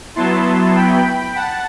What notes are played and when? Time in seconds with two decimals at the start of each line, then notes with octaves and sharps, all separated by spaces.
0.16 F#3 B3 E4 A5 C6
0.75 G5 B5
1.35 F#5 A5